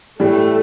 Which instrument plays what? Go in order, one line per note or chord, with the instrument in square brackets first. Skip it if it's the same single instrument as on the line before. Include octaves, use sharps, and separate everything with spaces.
[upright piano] A2 E3 G3 [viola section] A3